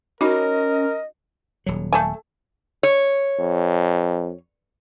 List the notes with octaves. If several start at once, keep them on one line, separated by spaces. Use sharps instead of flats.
C#4 D#4 F#4 A#4 D#5
D#1 F#3
A3 A4 G#5
C#5
F2